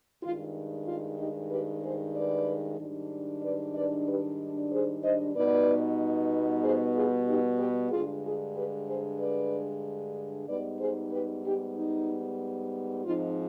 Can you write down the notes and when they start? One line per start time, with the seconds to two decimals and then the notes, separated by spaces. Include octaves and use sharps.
0.23 G2 D#3 G#3 F4
0.87 F4
1.19 D#4 G4
1.51 G4 B4
1.82 G#4 C5
2.15 B4 D5
2.79 G#2 D#3 G3 D4
3.43 B4 D5
3.75 B4 D5
4.07 G4 B4
4.71 G#4 C5
5.03 C5 D#5
5.35 B2 G3 B3 D#4 B4 D5
6.63 G#4 C5
6.95 F4 G#4
7.27 D#4 G4
7.59 G4 B4
7.91 G2 D3 G#3 F4 G#4
8.24 F4 G#4
8.56 G4 B4
8.87 G#4 C5
9.19 B4 D5
10.48 G#2 G3 B3 D#4 B4 D5
10.80 G#4 C5
11.12 G4 B4
11.44 D#4 G4
11.76 D#4
13.05 G#2 F3 C4 D#4 F4